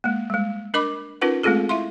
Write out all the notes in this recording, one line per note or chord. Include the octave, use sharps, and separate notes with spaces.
G#3 A#3
G3 G#3
D4 A#4 D#5 B5 D6
C#4 D#4 F4 A#4 B4 F#5
G#3 A3 C4 F4 G#4 A4
E4 E5 F5 C6